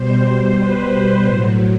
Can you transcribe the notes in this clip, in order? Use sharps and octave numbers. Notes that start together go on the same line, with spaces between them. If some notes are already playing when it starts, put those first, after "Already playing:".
Already playing: B2 G3 C5
B4
B4
A2 F#3 C5